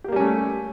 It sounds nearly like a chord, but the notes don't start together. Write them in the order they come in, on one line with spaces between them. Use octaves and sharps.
G4 A#3 G3 C#4 A3